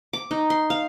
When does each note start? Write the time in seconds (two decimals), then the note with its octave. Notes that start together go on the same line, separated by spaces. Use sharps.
0.13 D6
0.31 D#4
0.50 C6
0.70 F5